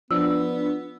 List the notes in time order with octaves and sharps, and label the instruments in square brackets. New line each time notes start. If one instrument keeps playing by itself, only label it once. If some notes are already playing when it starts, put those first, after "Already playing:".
[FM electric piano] F3 D4 [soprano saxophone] B3 [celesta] E6